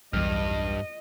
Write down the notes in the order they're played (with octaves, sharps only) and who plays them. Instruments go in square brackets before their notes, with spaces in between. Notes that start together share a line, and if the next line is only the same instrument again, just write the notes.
[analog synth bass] B1 [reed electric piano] E2 F6 [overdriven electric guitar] G2 [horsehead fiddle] D#5